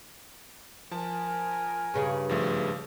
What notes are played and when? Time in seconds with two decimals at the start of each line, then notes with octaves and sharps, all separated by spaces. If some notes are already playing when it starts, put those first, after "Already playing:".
0.91 F3 A#4 G#5 A5
1.94 G2 C#3
2.29 G#1 F3 A3